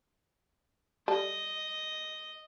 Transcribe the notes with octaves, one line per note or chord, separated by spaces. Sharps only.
G3 A4 D#5